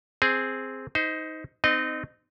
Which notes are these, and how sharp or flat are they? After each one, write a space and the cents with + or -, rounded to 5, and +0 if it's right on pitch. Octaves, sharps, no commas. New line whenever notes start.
C4 +0 G#4 +0
D#4 +15 C5 -25
C4 -30 D#4 -15 D#5 -25